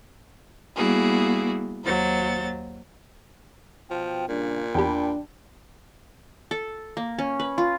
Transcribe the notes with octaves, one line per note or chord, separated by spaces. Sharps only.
G3 A#3 B3 E4 F#4 G#4
D#2 F#3 C5 A6
B2 F3 G5
A#2 C#3 G3 D4
E2 D4 G4 G5 A5 B5
A4
A#3
C#4
B4
F4